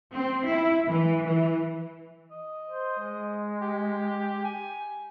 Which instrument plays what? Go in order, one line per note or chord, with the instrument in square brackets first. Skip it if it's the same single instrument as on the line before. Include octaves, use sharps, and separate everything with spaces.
[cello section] C4
E4
E3
E3
[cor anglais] D#5
[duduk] C5
G#3
[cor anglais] G4
G#5